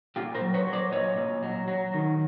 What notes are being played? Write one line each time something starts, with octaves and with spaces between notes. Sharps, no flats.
A#2 F4 G4
A#4 C5
F#3
B4 C#5
F#3
C5 D5
A#2 C#5 D#5
A#2
F#3
F#3
D#3